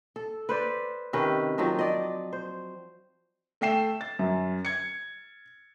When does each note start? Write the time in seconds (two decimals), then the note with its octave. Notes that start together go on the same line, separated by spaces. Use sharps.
0.16 A4
0.49 B4 C5 D5
1.13 C3 D#3 C#4 B4
1.58 D#3 F3 F#3 C4
1.79 D5 D#5
2.33 C5
3.61 A3 E5 G5 C7 E7
4.01 A6
4.19 F#2
4.65 G#6 C#7